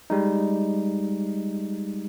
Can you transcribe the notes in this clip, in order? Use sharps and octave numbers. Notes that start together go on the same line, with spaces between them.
G3 G#3 D#4